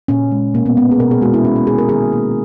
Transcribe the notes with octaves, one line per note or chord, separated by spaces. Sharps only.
A#2 C#4
G#3
B2 A#3
B3
G#3 B3
G#4
B2 A#4
G#4
G#3 F#4
E4
D#3 C#4
C#4
A#3 G#4
A#4
D#3 G#4
A#3